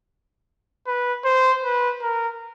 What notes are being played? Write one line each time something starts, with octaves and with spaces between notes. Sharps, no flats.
B4
C5
B4
A#4